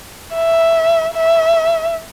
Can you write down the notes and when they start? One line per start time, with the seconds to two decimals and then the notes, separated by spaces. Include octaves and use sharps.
0.34 E5
1.14 E5